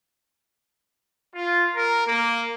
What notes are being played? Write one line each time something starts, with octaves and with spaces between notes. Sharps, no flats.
F4
A#4
A#3